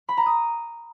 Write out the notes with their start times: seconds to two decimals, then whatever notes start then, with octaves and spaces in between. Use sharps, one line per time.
0.09 B5
0.17 A#5
0.26 D#6